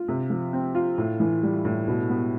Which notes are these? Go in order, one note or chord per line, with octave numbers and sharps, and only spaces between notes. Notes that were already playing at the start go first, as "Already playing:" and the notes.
Already playing: F4
C3
F3
C4
F4
A2
E3
G3
A2
B2
B3